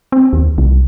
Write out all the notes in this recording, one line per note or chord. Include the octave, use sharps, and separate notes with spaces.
C4
D#2
C2